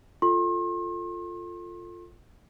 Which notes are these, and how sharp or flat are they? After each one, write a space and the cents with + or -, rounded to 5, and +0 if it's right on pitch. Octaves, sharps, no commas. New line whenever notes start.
F4 +0 A4 +10 C6 +40